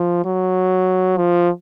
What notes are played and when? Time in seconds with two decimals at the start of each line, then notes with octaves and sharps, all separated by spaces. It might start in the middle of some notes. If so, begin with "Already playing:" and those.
Already playing: F3
0.25 F#3
1.17 F3